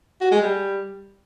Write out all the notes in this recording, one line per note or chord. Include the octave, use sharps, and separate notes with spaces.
F#4
G#3
G3